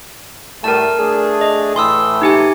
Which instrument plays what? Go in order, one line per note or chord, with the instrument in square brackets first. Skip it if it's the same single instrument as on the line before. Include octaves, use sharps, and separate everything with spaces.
[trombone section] A2 G3 A3 [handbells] A#4 A5
[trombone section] A3 D4 G#4
[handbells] D#5
[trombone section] A2 E3 A3 [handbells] C6 D#6 E6
[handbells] D#4 G4 G#5